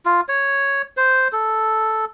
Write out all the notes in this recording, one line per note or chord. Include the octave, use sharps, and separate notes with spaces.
F4
C#5
C5
A4